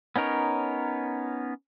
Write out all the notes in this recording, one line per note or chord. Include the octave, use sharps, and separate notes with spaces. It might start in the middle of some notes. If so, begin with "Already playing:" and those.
B3 C#4 D#4 A#4 C#5